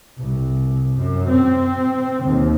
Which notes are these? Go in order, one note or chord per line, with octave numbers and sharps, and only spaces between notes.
C2
F#2
C4
D#2